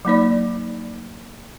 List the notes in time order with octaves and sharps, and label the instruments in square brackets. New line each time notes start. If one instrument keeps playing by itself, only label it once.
[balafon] F#3 A#3 D#4 D5